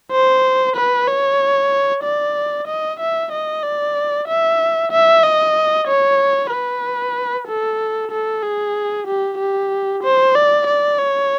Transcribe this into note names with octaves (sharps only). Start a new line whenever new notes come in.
C5
B4
C#5
D5
D#5
E5
D#5
D5
E5
E5
D#5
C#5
B4
A4
A4
G#4
G4
G4
C5
D5
D5
C#5